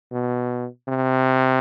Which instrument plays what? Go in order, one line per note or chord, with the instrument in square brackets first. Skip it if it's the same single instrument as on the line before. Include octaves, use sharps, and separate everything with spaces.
[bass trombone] B2
C3